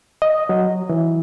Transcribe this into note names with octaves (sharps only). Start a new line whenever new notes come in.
D#5
F#3
E3